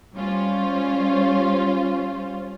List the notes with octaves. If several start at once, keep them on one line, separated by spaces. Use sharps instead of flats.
G3 C#4 F4 C5